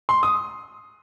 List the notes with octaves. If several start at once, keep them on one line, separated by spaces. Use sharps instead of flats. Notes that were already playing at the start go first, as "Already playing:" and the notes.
C6
D#6